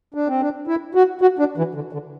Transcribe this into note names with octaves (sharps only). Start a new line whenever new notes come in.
D4
C4
D4
E4
F#4
F#4
D4
E3
D3
D3